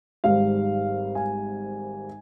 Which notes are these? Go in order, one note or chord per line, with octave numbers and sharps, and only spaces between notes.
G#1 G#2 G3 F5
G#5